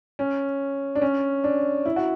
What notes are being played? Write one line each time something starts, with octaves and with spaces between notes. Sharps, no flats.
C#4
D4
C#4
D4
E4
F#4